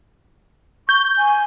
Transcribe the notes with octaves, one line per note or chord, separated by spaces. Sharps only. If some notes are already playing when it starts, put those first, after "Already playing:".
C#6 G6
G#5